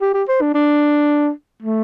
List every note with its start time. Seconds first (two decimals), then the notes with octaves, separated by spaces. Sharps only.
0.01 G4
0.14 G4
0.29 C5
0.41 D4
0.55 D4
1.63 A3